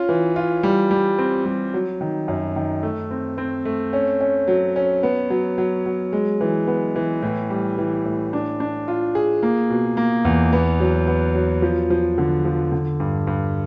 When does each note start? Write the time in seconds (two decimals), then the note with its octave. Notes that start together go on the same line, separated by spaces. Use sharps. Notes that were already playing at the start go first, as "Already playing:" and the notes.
Already playing: C#4 F4
0.09 E3
0.36 F4
0.63 G3
0.91 G3
1.18 C4
1.45 G3
1.74 F#3
2.01 D#3
2.28 F#2
2.56 D#3
2.83 A3
3.11 C4
3.38 C4
3.65 A3
3.93 C#4
4.21 C#4
4.48 F#3
4.76 C#4
5.03 B3
5.30 F#3
5.58 F#3
5.86 F#3
6.13 G#3
6.41 E3
6.67 B3
6.96 E3
7.22 A2
7.50 G3
7.78 E3
8.05 A2
8.33 D4
8.60 D4
8.88 F4
9.15 G#4
9.43 A#3
9.70 B2
9.97 A#3
10.25 E2
10.52 B3
10.80 F#3
11.08 B3
11.35 F#3
11.62 F3
11.90 F3
12.18 D3
12.45 F3
12.72 D3
13.00 G2
13.27 G2